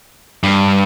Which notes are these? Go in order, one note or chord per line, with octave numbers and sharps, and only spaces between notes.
G2